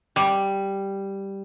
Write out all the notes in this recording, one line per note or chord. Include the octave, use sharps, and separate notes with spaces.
G3